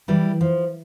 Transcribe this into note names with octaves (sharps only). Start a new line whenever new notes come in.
E3 G3
F3